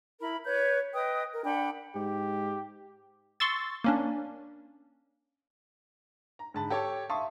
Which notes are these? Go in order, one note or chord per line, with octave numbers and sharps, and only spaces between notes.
E4 A#4 B5
B4 C#5 G6
B4 D#5 G5 D#6
A#4
D4 F#5 G5 B5
G#2 G4
C6 C#6 E6 A6
A#3 C#4 D4
A#5
G#2 D3 A5 B5
G4 A4 C#5 A5 D6
E5 F5 A5 C6 C#6 D#6